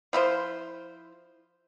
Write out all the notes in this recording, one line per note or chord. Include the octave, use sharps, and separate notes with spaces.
F3 E4 F4 C5